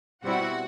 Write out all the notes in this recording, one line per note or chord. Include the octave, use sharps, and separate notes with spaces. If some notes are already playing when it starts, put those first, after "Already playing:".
B2 G3 C4 E4 F#4 F#5